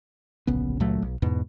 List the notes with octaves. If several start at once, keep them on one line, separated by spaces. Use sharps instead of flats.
D1 A#1 C#3 B3
C#2 A#2 F#3 A3
B1
E2 G#2 B2